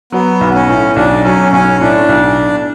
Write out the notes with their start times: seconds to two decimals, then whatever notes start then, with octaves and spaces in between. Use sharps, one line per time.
0.12 F#3 B3
0.41 B1
0.54 C#4
0.69 A2
0.96 B1 D4
1.24 F#3 C#4
1.52 B1 C#4
1.81 A2 D4
2.09 B1